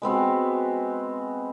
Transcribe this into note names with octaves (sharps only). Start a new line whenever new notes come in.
G#3 B3 C4 F#4